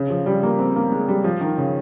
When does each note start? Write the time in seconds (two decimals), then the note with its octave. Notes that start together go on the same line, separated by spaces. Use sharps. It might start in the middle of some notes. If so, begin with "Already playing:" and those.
Already playing: C#3
0.10 F3
0.26 G3
0.43 A#3
0.59 C4
0.76 A#3
0.92 G#3
1.08 G3
1.24 F3
1.41 D#3
1.58 C#3